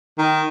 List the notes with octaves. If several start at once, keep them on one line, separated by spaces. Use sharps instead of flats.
D#3